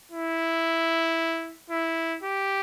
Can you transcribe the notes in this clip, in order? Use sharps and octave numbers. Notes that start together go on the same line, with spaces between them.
E4
E4
G4